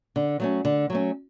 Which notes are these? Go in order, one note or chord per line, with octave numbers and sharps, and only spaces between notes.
D3
F#3 A3 C#4
D3
F#3 A3 C#4